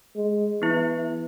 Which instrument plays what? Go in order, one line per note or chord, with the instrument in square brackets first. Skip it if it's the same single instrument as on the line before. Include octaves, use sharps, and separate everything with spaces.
[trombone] G#3
[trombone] E3 [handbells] B3 E4